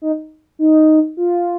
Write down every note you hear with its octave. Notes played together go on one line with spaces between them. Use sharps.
D#4
D#4
F4